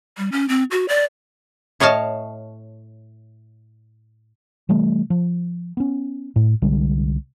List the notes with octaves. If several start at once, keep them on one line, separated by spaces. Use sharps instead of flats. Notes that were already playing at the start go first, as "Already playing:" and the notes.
G3
C#4
C4
F#4
D5
A2 C#5 D#5 F5 A5
C3 E3 G3 A3
F3
B3 C#4
A2
C2 D3 G3 G#3